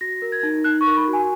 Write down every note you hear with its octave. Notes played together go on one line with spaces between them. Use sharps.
F#4 A#6
A#4
G#6
D#4
D#4 F#6
C#6
A#4
B5
F#4
G#5